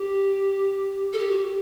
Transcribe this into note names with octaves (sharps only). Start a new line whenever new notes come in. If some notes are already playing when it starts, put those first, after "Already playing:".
Already playing: G4
A4
G4
F#4
G4